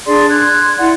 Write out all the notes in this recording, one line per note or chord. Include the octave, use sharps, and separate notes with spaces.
D4 G#4 D5 C6
C6 F#6 G#6
E4 D5 F#5 C6